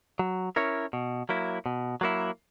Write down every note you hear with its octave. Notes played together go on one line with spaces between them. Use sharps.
F#3
C#4 E4 A#4 C#5
B2
F#3 A#3 E4
B2
F#3 A#3 E4